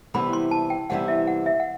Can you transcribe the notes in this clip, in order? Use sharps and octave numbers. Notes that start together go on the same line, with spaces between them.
C3 E3 G3 B3 E4 B5
C6
A5
G5
C3 E3 G3 B3 E4 F#5
E5
F#5
E5
F#5